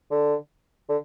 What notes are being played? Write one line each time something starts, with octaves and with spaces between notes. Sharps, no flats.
D3
D3